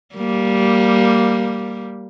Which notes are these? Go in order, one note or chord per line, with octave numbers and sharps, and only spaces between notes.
G3 A#3